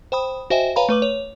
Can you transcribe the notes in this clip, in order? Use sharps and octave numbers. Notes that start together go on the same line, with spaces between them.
C5 G5 B5 D#6
F#4 C5 D#5 E5 G5 G#5
B4 C#5 F5 G#5 A#5 B5
A3 B4 D6 F#7
C#5